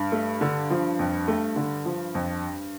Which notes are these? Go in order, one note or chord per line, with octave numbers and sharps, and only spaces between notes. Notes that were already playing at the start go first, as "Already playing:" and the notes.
Already playing: G2
A3
D3
F3
F2
A3
D3
F3
F2